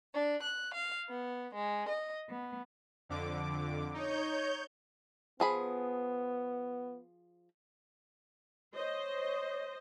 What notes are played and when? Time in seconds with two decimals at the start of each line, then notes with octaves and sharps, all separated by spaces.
0.13 D4
0.42 F#6
0.74 F5
1.08 B3
1.53 G#3
1.88 D#5
2.29 B3
3.09 F2 D3 D6
3.94 D#4 C#5 G6
5.40 F3 B3 G#4 B5
8.75 C5 C#5 D#5